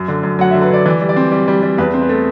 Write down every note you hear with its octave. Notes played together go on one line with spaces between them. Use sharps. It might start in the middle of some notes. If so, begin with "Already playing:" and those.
Already playing: F#2
D3
F#2
F#3 F#5
E5
D3
B4
D3 D5
E3 D5
G3
D5
C4
G3
G3
G3
E2 B4
C4
B4
A3